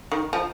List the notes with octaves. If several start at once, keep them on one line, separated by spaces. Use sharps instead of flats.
D#3
F3